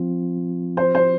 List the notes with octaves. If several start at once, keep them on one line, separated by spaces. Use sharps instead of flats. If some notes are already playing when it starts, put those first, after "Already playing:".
Already playing: F3 C4 F4
C5
C5